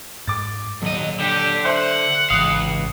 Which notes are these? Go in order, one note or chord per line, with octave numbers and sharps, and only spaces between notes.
G#2 D6 A6
D#1 D#2 F#3 D#5
D3 G4
C5 E5 F#5
G#1 C#2 G#2 E3 F5 D#6